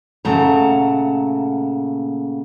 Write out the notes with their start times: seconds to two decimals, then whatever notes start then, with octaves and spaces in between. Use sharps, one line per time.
0.25 A#2 C#3 A3 F#5 A5 A#5